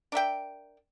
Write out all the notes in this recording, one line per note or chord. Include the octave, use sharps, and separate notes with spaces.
D4 A#4 E5 G5